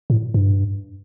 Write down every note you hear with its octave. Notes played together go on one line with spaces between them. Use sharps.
A2
G2